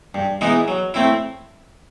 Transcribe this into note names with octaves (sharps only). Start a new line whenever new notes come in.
G2
E3 G#3 B3 D#4
F#3
A3 C4 E4